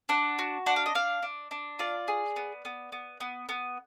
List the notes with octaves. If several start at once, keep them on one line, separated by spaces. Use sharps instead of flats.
D4 F#5
F#4
D4 F#5
F5
D#5
D4 F5
D4
D4
F4 D5
G#4
B3
B3
B3
B3
B3